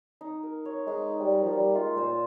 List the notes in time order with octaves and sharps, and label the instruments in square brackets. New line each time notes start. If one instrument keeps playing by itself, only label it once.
[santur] D#4
A#4
C#5
[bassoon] G#3 [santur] D#4
[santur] D#4
[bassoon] G3
[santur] A#4
[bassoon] F3
[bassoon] G3 [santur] A#3
[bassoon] G#3 [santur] F4
[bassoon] A#2 [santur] C5